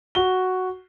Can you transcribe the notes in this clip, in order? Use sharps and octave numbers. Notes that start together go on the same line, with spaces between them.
F#4 G7